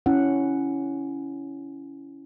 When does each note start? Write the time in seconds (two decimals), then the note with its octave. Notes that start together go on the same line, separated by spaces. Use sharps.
0.06 C#4 E4 F#5